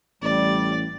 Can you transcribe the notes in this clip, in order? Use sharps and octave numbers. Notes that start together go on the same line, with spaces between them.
A1 G3 D5